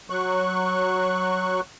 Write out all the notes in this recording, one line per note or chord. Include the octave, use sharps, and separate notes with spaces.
F#3 C#6 F#6